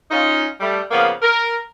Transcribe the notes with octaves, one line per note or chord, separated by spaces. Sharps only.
C#4 D#4 F4
G3 A3
C#3 F3 A#3 B3 F5
A#4